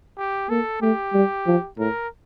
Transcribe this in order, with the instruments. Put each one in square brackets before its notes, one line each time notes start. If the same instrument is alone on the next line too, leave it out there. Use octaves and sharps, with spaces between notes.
[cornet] G4
[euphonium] A#3 [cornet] A4
[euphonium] A3 [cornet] G4
[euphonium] G3
F3
[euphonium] A2 [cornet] A#4